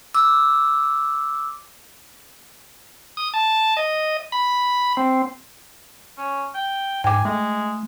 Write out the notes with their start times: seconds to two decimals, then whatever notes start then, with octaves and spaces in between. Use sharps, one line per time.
0.14 D6 E6
3.17 D#6
3.34 A5
3.77 D#5
4.32 B5
4.97 C4
6.18 C#4
6.55 G5
7.04 G#2 G5 G#5 D6
7.25 G#3 A3